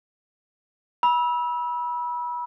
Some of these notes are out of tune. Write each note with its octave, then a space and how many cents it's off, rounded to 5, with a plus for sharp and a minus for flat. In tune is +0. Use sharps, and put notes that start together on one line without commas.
B5 -30 E6 -15